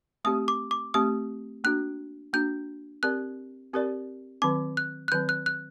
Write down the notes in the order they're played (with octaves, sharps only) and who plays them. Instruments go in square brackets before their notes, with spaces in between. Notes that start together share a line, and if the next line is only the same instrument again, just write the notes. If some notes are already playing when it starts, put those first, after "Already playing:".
[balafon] A3 C4 G4 [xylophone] D#6
[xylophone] D6
D6
[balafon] A3 C4 G4 [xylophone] D#6
[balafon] A#3 D4 F#4 [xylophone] F#6
[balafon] A#3 D4 F#4 [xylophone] G6
[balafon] C4 G4 A#4 D5 [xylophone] F#6
[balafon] C4 G4 A#4 D5
[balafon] D#3 F#3 C4 [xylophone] D6
[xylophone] F#6
F#6
[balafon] D#3 F#3 C4 [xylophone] G6
[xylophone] F#6
F#6